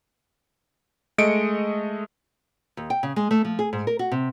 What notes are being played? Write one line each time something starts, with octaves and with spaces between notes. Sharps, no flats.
G#3 A3 D#5 C#7 D7
D#2
G5
C#3
G#3
A3
F3
G#4
G#2
A#4
F#4
C3